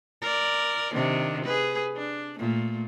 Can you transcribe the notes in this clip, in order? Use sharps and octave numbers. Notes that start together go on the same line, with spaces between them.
A#4 D5
C3 D#3 D4
G#4 B4
D4
A#2 A3